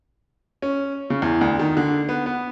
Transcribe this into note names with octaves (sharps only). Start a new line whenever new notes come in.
C#4
C#3
E2
D2
D#3
D3
B3
B3